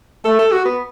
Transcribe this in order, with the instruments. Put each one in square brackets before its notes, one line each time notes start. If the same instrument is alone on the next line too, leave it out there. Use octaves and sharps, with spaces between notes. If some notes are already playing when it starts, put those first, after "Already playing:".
[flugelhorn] A3 [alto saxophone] A4
[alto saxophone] A4
F#4
B3